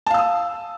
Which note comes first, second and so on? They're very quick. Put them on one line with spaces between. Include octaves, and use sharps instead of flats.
A5 F5 E6 D#6